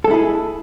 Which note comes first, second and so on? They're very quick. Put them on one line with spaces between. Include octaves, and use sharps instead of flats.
A4 G#3 E4 G#4